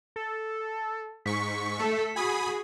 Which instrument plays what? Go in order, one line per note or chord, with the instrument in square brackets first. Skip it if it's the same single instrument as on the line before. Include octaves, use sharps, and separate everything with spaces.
[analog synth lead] A4
[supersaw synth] G#2 C#6 [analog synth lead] B6
[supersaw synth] A3 [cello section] A4
[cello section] F#4 G#4 [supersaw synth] G#5 B5 D#6